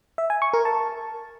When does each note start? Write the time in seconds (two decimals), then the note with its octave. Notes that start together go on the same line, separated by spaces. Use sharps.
0.18 E5
0.30 G#5
0.42 C#6
0.53 A#4
0.65 A5